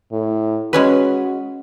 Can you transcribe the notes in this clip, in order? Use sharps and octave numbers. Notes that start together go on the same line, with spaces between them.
A2
G#3 C#4 F#4 B4